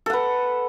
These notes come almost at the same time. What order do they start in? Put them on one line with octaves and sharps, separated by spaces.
A4 F#5 B4